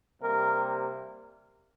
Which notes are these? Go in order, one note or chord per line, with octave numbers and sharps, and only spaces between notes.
C3 G3 A#3 A#4